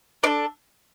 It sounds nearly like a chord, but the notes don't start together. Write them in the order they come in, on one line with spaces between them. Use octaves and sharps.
D4 D5 A4